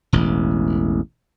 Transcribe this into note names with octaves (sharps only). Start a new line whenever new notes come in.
E1 A1